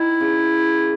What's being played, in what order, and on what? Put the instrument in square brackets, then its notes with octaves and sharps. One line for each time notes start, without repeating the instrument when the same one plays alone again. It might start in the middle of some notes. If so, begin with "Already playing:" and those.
Already playing: [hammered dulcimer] D#3 [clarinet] E4
[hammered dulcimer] C#3